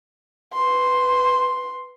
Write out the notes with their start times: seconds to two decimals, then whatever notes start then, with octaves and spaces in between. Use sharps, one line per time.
0.53 B4 C6